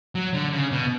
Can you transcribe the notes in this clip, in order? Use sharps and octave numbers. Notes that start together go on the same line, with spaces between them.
F#3
D3
C#3
B2